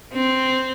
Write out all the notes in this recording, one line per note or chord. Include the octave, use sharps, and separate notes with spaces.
C4